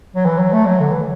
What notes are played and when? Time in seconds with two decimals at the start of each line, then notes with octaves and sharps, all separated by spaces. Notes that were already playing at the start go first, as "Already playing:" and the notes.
0.16 F#3
0.25 E3
0.39 F#3
0.53 A3
0.66 F#3
0.80 D3
0.91 E3